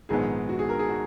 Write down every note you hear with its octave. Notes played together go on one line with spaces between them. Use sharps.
A#1 G#2 D#3 G#3 B3 G#4
F#4
G#4
A#4
G#4
F#4